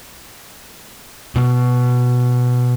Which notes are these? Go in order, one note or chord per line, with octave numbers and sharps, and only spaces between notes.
B2 B3